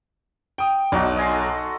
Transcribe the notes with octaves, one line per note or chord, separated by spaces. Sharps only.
G5 D#6
B1 D4 D#4 F#4
D#5 G#5 C6
A4